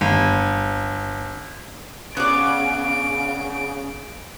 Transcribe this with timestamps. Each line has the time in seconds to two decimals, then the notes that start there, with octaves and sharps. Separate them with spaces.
0.01 G1
2.17 C#3 B3 D5 D7